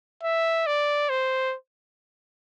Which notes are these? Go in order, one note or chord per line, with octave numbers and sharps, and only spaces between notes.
E5
D5
C5